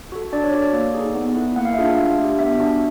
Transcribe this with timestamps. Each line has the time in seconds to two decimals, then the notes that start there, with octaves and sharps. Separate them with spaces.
0.12 F#4 A4
0.33 D4 D5
0.44 C#5
0.53 F#4 A4 D5
0.73 A#3
0.95 D#4 G#4
1.15 B3
1.36 E4 A4
1.56 A#3 F#5
1.65 F5
1.74 E5
1.77 D4 F4 G#4 F5
1.98 A3 E5
2.18 D4 G4
2.38 B3 E5
2.59 D4 F#4